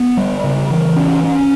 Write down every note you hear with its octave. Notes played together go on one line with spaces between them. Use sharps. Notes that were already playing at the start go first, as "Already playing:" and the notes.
Already playing: B3
G3
C#3
E3
C#4
C#4